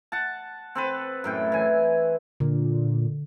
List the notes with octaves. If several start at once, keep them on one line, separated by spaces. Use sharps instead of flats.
F#5 A5
C4 A4 B4
F#2 A2 G5
E3 G#5
A#2 D3